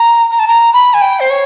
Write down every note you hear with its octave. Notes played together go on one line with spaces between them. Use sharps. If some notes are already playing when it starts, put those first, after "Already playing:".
Already playing: A#5
A#5
A5
A#5
B5
G#5
G5
C5
C#5